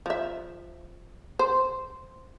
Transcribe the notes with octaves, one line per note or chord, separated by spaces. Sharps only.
F3 E5
C5